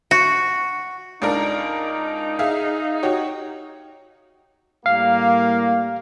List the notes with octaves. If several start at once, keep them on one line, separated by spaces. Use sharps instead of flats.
F#4
C#2 D4 D#4 A#4
G#4 E5 F5
F#4 G4 C#5
A2 G3 A#3 F5